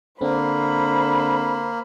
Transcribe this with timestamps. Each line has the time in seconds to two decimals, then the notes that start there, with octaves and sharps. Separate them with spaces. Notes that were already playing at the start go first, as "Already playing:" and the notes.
0.21 D3 A#3 C4 C5 B5